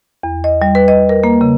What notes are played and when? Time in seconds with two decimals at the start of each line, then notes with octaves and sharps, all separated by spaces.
0.23 E2
0.44 D#5
0.62 G3
0.75 B4
0.88 D#5
1.09 A#4
1.24 A#3
1.41 C#3